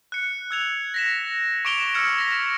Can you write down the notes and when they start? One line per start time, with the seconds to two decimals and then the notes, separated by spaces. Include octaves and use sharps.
0.12 F#6 C#7
0.51 E6 G#6 F7
0.94 A#6 B6 E7
1.65 C#6 D6 D7 F7 G7
1.95 E6 F6 G#6 C#7
2.18 A#6 B6